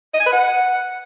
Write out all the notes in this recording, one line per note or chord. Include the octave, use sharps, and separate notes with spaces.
D#5
G#5
B4
F#5